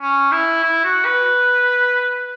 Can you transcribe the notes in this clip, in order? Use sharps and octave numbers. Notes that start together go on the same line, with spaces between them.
C#4
E4
E4
F#4
B4